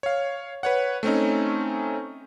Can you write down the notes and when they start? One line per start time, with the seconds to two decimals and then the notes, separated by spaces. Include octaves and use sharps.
0.03 C#5 F5
0.63 B4 C#5 F#5
1.03 A3 C4 C#4 D#4